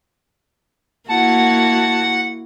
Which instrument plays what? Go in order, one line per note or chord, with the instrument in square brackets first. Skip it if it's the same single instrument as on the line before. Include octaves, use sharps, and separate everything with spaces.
[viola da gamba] A#3 E4 F#4 [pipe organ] F#5 [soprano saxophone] A5